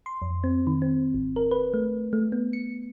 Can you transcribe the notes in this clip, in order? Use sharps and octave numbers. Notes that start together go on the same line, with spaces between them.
C6
F2
C4
D#3
C4
G#1
A#4
B4
A3
A3
B3
C#7